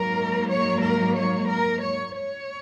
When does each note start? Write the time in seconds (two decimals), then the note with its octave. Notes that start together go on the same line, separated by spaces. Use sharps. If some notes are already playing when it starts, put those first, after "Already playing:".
Already playing: G#2 F#3 A#3 A#4
0.49 C#5
0.82 A#4
1.15 C#5
1.48 A#4
1.82 C#5
2.15 C#5